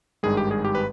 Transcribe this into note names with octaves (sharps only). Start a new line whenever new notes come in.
G#1 G2 D#3 G#3 G#4
G4
G#4
G4
B4